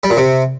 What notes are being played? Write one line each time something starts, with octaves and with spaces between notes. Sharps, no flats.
G3
A#2
C3